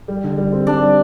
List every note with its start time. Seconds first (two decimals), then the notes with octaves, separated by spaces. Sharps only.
0.08 G3
0.24 D3
0.38 G3
0.53 C4
0.67 G3 D4
0.81 G3